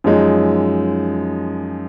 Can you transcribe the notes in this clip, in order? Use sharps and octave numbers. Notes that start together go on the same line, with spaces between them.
F#2 F3 G#3 D#4